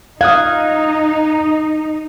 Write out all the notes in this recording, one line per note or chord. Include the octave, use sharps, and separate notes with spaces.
D#4 F5 D#6 F#6 G#6